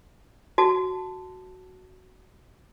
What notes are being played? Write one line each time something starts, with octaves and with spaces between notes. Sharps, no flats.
F#4 A5